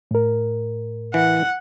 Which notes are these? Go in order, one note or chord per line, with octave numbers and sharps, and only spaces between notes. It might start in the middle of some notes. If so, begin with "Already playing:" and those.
A2 A#4
E3 F#5